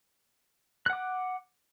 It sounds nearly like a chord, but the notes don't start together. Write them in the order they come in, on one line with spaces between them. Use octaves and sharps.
F#6 F#5 D6